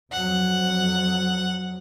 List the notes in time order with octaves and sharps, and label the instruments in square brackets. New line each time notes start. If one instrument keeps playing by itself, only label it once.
[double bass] F2 F#3 [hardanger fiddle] F#5